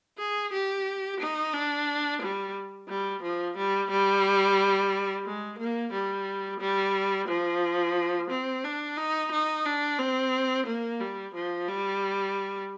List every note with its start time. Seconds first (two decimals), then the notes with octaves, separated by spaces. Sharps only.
0.18 G#4
0.53 G4
1.20 D#4
1.53 D4
2.22 G3
2.89 G3
3.23 F3
3.57 G3
3.91 G3
5.26 G#3
5.59 A#3
5.93 G3
6.60 G3
7.28 F3
8.30 C4
8.64 D4
8.97 D#4
9.32 D#4
9.66 D4
9.99 C4
10.67 A#3
11.00 G3
11.34 F3
11.68 G3